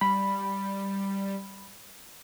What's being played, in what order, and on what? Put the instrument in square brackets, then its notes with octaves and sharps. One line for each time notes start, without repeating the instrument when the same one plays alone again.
[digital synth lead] G3 [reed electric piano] B5